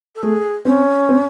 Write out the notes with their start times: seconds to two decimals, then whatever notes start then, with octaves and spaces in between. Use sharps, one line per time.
0.15 A4
0.22 A3 G#4
0.65 C4 C#4
1.09 C4